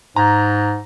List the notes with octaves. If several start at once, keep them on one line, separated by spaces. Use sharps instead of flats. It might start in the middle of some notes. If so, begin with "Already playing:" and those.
G#2 A#5